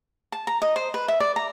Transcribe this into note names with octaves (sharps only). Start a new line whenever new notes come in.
A5
A#5
D#5
C5
B4
E5
D5
A#5